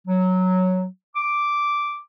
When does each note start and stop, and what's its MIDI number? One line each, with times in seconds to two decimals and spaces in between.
0.08 0.84 54
1.15 1.99 86